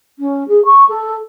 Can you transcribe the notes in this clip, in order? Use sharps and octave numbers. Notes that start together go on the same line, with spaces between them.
C#4
G#4
C#6
A4